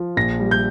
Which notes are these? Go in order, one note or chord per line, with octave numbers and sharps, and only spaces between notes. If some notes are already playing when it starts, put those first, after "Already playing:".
Already playing: F3
A#1 A#6
G3
G6